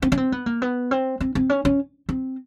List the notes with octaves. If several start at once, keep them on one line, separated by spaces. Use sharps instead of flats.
C4
C#4
C4
B3
A#3
B3
C4
C4
C4
C#4
C#4
C4